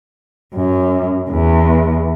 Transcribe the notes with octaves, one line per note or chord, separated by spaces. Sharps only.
F#2
E2